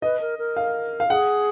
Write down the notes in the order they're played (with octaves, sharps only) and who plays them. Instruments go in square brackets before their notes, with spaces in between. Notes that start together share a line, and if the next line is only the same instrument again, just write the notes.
[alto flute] B4 [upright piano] D#5
[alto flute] A#4
A#4
[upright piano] F5
F5
[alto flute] G#4 [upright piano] F#5